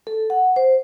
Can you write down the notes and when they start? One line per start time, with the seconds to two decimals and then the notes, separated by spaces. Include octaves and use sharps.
0.07 A4
0.30 F#5
0.56 C5